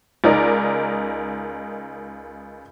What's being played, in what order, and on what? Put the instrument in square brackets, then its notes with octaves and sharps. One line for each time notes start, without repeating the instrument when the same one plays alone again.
[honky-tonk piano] C#2 D#4 A#4 D5